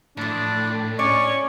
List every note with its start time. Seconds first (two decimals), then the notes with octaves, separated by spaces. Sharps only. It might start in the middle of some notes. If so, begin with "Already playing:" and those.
0.17 A2 E3 F3 D4
0.99 C#4 D5 C#6